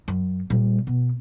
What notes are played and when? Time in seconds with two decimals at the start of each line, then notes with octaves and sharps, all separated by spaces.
0.08 F#2
0.50 A#2 G3
0.87 B2